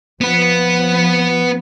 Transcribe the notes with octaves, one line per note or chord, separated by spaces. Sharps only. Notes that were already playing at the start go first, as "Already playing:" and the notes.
F3 B3 B4